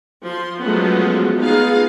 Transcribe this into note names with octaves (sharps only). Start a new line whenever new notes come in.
F3 C6
F3 F#3 G#3 A3 B3 C#4
B3 D#4 F4 G#4 F5